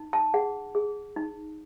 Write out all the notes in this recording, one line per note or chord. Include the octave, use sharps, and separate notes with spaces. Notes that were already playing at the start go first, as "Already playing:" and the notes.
Already playing: D#4
A5
G#4 F#5
G#4
D#4